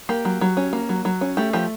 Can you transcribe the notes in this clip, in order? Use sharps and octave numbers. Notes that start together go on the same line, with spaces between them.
A#3 G4
F#3
F#3
C#4
A#3
F#3
F#3
C#4
A3 G4
F3 G4